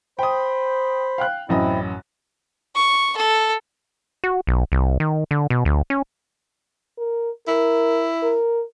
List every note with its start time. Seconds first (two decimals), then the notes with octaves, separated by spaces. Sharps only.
0.19 C5 G5 B5 D#6
1.18 F5 G5 F#6
1.49 A1 F#2 C4 E4 D#5
2.75 C#6
3.16 A4
4.24 F#4
4.47 B1
4.72 C2
5.00 D#3
5.31 D3
5.50 B2
5.65 D2
5.90 C#4
6.98 A#4
7.48 E4 A#4
8.23 A#4